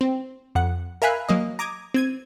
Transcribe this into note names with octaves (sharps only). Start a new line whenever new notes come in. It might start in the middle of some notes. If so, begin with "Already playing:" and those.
C4
F2 F#5
A#4 E5 F5 G#5 B5 F#6
F#3 A#3 D#5
A#5 D6 D#6 G#6
C4 G#6 D#7